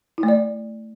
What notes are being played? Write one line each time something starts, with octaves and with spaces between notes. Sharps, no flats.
E4
A3
D5